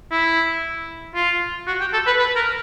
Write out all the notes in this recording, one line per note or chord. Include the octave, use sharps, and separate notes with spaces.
E4
F4
F#4
G4
A4
B4
B4
A#4